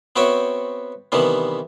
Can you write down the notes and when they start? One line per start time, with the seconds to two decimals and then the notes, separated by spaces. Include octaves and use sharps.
0.16 B3 C4 F#4 C#5 E5 G5
1.12 C3 D#3 E3 G3 B3